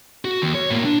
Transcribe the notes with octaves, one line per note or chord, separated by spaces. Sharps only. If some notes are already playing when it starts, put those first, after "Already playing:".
F#4
D#2
C#5
A2 A#3
D4